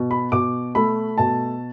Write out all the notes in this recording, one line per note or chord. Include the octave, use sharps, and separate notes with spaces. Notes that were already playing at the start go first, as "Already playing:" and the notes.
Already playing: B2
B5
B2 D6
A3 B5
B2 A5